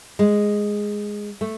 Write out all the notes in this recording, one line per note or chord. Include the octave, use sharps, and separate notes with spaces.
G#3
A3